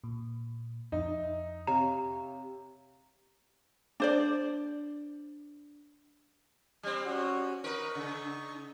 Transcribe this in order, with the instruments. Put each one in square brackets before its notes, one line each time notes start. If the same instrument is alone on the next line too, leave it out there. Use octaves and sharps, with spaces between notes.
[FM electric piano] A#2
[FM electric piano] F2 E5 [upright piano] D#4
[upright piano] C3 [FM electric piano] G4 C#5 F5 [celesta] A#5
[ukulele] D4 C5 D5
[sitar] G3 C4 [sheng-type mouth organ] F6
[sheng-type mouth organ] C#4 F#4
[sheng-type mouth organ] D#4 C#6 [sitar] A#4 B4
[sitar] C#3